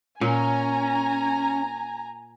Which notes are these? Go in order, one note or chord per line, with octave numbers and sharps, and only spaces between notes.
A#2 C#4 G#5 A#5